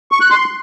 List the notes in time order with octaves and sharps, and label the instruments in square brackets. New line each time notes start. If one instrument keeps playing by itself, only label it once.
[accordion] C#6
F#6
C6